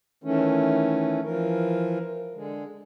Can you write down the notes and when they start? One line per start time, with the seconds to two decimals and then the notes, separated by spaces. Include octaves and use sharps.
0.24 D#3 E3 A3 C#4
1.25 E3 F3 A#4
2.35 D3 G#3